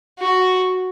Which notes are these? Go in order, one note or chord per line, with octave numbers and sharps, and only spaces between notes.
F#4